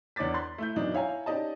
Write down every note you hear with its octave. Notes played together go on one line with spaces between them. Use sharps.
E2 D4 C#5 D6 A6 B6
A#5 C6 F#6 A6
A3 E4 G6
F#2 B2 E3 D4 D#4
E4 C#5 F5 G#5 A#5
C#4 D#4 G4 D5 D#5 A5